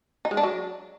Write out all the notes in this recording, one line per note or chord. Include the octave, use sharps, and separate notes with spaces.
D#4
G#3
D4
F#3